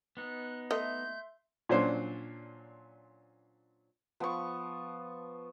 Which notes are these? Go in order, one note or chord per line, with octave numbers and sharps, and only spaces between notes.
B3 D#4 F#6
A3 D#5 E5 C6 G6
A#2 F#3 C#4 D4 C5
F3 B3 C#6